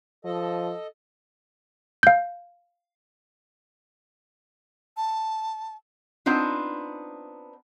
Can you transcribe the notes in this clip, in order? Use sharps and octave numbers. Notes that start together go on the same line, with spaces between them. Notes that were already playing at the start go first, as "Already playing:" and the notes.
F3 A4 D#5
F5 G6
A5
B3 C4 D4 D#4 F4